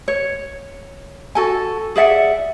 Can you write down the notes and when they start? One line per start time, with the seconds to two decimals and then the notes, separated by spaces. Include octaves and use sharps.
0.08 C#5
1.35 F#4 A4 G#5
1.96 G#4 D5 E5 F#5